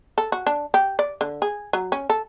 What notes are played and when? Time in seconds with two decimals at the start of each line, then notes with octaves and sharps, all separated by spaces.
0.18 A4
0.32 F#4
0.47 D4
0.74 G4
0.99 D5
1.21 D3
1.42 G#4
1.73 F#3
1.92 C#4
2.10 A4